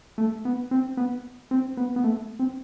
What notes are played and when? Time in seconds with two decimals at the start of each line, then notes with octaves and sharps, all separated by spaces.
0.18 A3
0.45 B3
0.71 C4
0.97 B3
1.51 C4
1.77 B3
1.96 B3
2.04 A3
2.39 C4